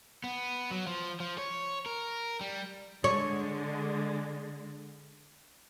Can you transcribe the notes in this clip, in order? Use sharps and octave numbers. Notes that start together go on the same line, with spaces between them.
B3
F#3
F3
F3
C#5
A#4
G3
D3 G#3 C#5